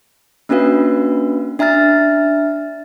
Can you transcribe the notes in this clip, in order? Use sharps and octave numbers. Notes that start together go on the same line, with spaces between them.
A#3 C#4 D4 F#4 B4 F5
D4 E5 A#5 F6 A6